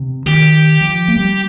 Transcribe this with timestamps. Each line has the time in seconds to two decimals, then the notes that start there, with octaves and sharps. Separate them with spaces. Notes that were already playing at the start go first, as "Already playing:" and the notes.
Already playing: C3
0.26 D#3 G4
0.81 F3
1.08 A#3
1.16 G3